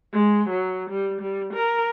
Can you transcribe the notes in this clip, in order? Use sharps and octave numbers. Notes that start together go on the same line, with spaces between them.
G#3
F#3
G3
G3
A#4